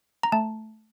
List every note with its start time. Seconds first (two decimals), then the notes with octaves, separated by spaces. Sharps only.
0.23 A#5
0.32 A3 A5